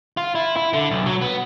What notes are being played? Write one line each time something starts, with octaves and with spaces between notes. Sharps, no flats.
F4
E4
E4
D3
B1
F#3
B3